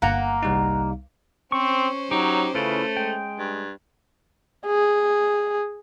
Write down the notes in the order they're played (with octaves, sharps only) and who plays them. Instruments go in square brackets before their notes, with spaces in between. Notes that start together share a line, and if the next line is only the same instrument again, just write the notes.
[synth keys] G1 F#5 A#5 [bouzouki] A#3
[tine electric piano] C2 G3 D#4
[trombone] C4 [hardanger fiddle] C#4 C5 [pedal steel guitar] C#6
[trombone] F#3 [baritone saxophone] D#4 [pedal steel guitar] G4
[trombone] C#3 [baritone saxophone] A3 [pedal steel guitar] E4 F4 B4
[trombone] G#3 [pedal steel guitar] G5
[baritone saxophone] G2
[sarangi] G#4